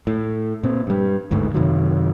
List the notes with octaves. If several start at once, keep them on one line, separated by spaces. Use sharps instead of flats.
A2
A#2 C4
G2 G3
G1 D2 G#2 D3
F#2 C3 D#3 F#3